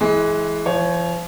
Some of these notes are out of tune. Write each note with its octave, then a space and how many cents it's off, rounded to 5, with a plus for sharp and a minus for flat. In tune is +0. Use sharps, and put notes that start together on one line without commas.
E3 +0 G#3 +25
F3 -35 C#5 +0